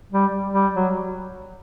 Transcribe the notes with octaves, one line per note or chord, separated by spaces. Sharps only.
G3
G3
F#3